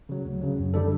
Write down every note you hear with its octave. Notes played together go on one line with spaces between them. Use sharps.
C#3 F#3
D2
C#3 F#3
F#2
D3 G3 D4 A4